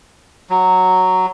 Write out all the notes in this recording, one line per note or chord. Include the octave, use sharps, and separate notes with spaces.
F#3